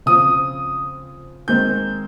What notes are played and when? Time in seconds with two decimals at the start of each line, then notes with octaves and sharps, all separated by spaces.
0.06 C#3 F3 C4 F4 D#6
1.48 D#3 G#3 C4 G6